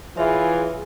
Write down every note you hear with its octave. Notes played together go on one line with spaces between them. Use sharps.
E3 F4 G#4 C#5 E5